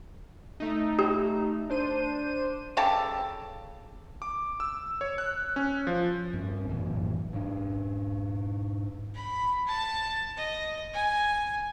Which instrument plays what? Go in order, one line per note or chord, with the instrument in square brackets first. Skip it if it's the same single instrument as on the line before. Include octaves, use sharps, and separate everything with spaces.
[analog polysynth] A3 D#4
[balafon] G4
[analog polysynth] D4 C5 D#7
[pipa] C#3 G4 A4 A5
[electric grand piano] D6
E6
C#5
F#6
C#4
F3
[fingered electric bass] G2 C#4
A1 F#2 A#2 E3
G#2 D4
[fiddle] B5
A5
D#5
G#5